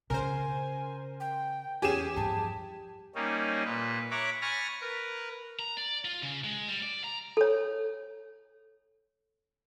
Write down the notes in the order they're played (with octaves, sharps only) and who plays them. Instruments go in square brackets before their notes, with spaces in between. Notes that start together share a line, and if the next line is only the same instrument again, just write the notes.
[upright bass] C#3 C#4 [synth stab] A#4 C5 [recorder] G#5
[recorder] G5
[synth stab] E2 G#4 G#5 [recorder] C#4 [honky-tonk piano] G4 D#7 E7
[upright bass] G2 F3 [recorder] A5
[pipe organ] G3 A#3 C#4 D#4
A#2 B4
C#5 E5 A#5 B5 D6 F#6
G#5 B5 C#6 F6 A6 A#6
A#4 B4
[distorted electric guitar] A#5
D5
F4
C#3
G#3
G3
D5
A#5
[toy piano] A4 C#5